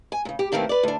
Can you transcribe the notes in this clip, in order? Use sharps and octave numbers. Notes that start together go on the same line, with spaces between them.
G#5
A#2 C#3
G4
B2 D#3 A3 A#3 C4 G4
B4 D5
D2 D4